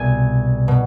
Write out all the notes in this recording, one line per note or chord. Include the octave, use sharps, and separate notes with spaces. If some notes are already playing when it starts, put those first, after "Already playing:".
Already playing: C2 B2 G#5
B2